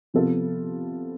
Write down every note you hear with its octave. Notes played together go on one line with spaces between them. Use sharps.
C3 F3 B3 F4 A4